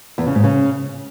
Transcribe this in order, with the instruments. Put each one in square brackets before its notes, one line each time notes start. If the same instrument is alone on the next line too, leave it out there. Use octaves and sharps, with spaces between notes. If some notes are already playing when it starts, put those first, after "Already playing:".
[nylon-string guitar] E2
C#3
G#2
C#3